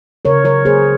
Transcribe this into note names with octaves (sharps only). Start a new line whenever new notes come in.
C#3 A#4 C#5
F#3 A#4 C#5
A#3 G#4 C5